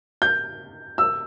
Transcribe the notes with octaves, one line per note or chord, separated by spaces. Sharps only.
G6
E6